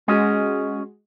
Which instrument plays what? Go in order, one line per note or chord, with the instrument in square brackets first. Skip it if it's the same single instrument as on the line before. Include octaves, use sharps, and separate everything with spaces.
[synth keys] G#3 F#4 G#4 [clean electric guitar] C#4 D#5